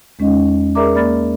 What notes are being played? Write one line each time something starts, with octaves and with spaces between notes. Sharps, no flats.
E2 G#3 C#4 D#4 D#5
G#4 A#4 D5 E5 A#5 D6
A#3 D5 B5 F6 A6